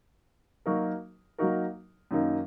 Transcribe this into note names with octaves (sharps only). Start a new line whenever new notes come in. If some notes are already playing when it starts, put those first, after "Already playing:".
F#3 A#3 D#4 F#4 A#4
F#3 A#3 D#4 F#4 A#4
F#2 D#3 A#3 D#4